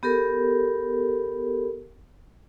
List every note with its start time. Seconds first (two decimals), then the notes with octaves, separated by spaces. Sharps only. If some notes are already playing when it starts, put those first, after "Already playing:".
0.03 B3 G4 A4 A#4